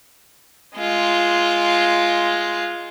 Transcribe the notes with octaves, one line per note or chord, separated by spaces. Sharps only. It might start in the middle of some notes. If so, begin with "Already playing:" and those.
G#3 F4